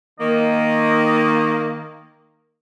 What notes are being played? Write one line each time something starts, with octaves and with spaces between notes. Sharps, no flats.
D#3 A#3 D#5